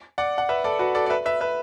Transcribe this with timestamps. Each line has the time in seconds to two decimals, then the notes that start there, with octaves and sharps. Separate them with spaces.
0.18 D5 F#5
0.38 F#5
0.49 B4 E5
0.64 A4 D5
0.79 F#4 B4
0.95 A4 D5
1.06 D5
1.10 B4 E5
1.26 B4 E5
1.41 B4 E5